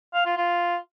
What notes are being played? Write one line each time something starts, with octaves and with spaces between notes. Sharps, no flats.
F5
F4
F4